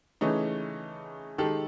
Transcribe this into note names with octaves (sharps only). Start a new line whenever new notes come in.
C#3 E3 A3 C#4 D#4
D#3 G#3 G4 A4